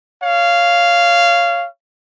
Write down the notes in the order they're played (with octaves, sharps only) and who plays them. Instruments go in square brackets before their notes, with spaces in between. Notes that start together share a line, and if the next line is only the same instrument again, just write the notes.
[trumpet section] C#5 F5